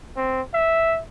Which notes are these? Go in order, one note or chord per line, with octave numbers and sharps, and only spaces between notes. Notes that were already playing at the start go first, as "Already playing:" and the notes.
C4
E5